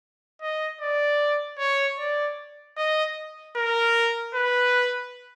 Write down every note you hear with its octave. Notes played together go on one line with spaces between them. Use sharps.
D#5
D5
C#5
D5
D#5
A#4
B4